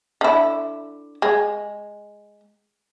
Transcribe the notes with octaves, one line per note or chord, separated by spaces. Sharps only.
D3 E4
G#3